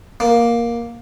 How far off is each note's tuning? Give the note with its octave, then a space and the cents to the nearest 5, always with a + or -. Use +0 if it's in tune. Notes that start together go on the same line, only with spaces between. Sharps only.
A#3 +10